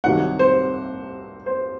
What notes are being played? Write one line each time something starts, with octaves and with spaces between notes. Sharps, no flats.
C2 C3 D#3 F#3 F#5
C5
C5